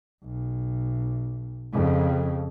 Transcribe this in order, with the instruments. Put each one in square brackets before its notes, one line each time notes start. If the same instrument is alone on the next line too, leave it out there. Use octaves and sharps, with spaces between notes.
[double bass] B1
F2 C#3